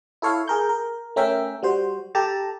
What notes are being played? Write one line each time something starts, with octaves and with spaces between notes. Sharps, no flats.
E4 A4 C#5 F5
G#4 A#4 G6
A#4
A3 C#4 A#4 E5 G5
G3 F#4 C5
G4 A4 A5 A#5